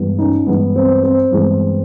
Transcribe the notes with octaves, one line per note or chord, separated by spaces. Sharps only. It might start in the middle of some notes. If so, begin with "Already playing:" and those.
Already playing: G2 E3 G#3 B3
C#4 D#4
G2 E3 G#3 B3
C4
C4
G2 E3 G#3 B3